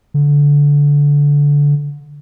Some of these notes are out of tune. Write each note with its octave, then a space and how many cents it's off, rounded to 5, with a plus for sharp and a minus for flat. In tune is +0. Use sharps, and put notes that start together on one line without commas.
D3 -20